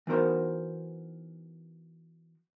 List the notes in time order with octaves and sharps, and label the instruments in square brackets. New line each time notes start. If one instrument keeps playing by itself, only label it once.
[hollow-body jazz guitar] E3 B3 D#4 F#4 A#4 C5